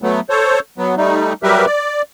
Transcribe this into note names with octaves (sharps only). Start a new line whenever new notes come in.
F#3 A3 B3
A4 C5 C#5
F#3 B3
G3 A3 D#4
F#3 G3 G4 A#4 B4 E5
D5